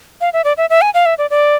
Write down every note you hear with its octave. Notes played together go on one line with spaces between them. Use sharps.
F5
E5
D5
E5
E5
G#5
F5
E5
D5
D5